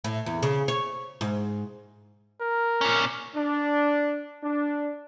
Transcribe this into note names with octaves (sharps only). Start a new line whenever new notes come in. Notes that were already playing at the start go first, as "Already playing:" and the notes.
A2
E2
C#3
C#5
G#2
A#4
A#2 C#4
D4
D4